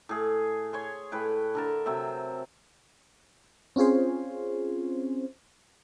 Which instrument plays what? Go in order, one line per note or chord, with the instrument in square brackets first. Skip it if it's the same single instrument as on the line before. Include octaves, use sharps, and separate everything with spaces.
[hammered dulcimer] A2 G#4
C#5 G#5 C6
A2 B4 G5
D3 A#4 A5
C3 F#3 C4 E5
[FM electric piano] C4 C#4 F4 G#4 C5